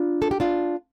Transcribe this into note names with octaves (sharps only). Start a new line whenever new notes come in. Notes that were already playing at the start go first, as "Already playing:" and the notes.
Already playing: D4 F4
A4
G4
D4 F4